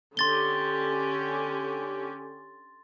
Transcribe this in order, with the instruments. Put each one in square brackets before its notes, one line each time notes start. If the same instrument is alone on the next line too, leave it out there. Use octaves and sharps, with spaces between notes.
[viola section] D3 C#4 G4 [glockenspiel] C6 A6 G7